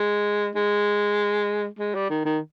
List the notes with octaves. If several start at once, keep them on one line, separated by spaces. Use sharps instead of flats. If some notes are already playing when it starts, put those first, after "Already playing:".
Already playing: G#3
G#3
G#3
G3
D#3
D#3